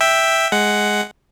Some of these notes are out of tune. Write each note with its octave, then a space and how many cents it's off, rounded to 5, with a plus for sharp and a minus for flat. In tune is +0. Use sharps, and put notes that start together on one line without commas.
E5 +0 G5 +5
G#3 +0 F#5 +5